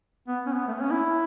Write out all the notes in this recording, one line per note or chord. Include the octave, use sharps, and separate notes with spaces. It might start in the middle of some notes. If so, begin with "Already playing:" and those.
B3
C#4
B3
A3
B3
C#4
E4